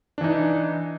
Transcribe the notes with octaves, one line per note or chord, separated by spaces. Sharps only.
E3 D4 D#4